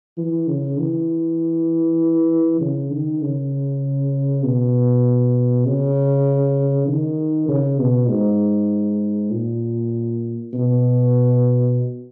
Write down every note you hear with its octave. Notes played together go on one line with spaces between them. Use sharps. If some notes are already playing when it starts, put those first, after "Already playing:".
E3
C#3
E3
C#3
D#3
C#3
B2
C#3
D#3
C#3
B2
G#2
A#2
B2